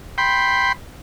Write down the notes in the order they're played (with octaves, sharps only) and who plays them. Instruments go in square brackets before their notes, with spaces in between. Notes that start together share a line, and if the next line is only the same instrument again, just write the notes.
[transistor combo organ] G5 B5 C6